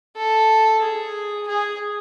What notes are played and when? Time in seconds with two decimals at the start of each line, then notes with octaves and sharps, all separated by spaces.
0.17 A4
0.83 G#4
1.48 G#4